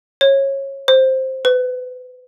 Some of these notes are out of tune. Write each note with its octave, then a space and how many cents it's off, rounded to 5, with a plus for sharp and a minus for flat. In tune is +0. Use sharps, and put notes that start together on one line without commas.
C#5 -20
C5 +5
B4 +30